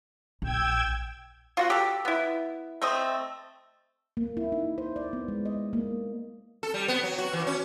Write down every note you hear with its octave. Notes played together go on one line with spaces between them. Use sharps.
A#1 G5 E6 G#6
F4 F#4 F#5
G4 A4
B3 E4
A3 C4 D#5
A#3
E4
D#4
C5
D5
B3
G#3
D#5
A#3
A4
G3
B3
F#3
F#4
E3
C#4